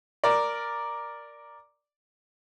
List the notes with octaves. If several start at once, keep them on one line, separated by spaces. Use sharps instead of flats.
A#4 D5